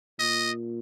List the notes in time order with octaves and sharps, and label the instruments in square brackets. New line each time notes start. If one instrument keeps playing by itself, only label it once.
[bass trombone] A#2 [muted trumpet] D#5